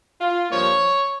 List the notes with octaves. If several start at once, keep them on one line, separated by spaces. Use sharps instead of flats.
F4
G2 F3 A#3 C#5